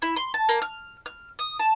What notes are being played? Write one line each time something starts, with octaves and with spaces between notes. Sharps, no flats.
E4
C6
A5
A#3
F6
F6
D#6
A5